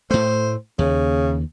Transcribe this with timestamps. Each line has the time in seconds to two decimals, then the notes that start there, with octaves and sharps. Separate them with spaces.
0.11 A2 A3 C5
0.79 D#2 C#3